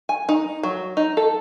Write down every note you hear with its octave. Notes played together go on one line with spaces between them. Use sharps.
G#5
D#4
F#3
D#4
A4